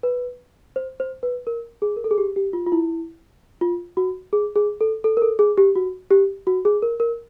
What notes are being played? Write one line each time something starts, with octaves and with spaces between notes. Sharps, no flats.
B4
C5
C5
B4
A#4
G#4
A#4
A4
G#4
G4
G4
F4
F4
E4
F4
F#4
G#4
G#4
A4
A4
A#4
A4
G#4
G4
F#4
G4
F#4
G#4
A#4
A#4